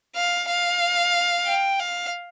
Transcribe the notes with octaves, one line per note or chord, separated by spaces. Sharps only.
F5
F5
G5
F5